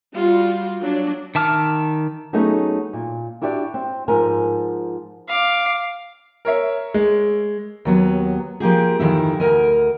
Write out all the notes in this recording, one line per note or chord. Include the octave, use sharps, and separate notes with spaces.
G3 F4 F#4
F#3 D4
D#3 E5 A5 D6 F6
F#3 A3 B3 C#4 D#4 G#4
A#2
D4 E4 F#4 G4 D5
C4
G#2 F3 A#4 G#5
F5 D6
A#4 C#5 E5
G#3
D#2 F#3 B3
F3 A#3 G4 G#4
F2 D#3 E3 E4
D2 A#4 G#5